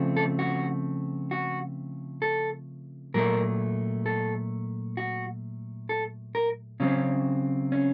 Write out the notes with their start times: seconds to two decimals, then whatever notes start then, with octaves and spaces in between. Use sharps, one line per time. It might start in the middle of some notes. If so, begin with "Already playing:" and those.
Already playing: C#3 F3 A3 C4
0.17 A4
0.39 F#4
1.31 F#4
2.22 A4
3.14 A#2 F#3 A3 A#4
4.06 A4
4.97 F#4
5.89 A4
6.35 A#4
6.80 C#3 F#3 C4 C#4
7.72 C#4